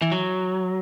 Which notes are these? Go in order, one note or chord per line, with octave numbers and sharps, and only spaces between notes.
E3
F#3